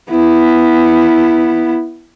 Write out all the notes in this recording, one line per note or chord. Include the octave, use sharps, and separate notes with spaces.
B3 E4